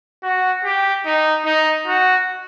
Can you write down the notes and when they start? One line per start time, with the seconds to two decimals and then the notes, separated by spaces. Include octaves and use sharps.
0.23 F#4
0.64 G4
1.06 D#4
1.46 D#4
1.87 F#4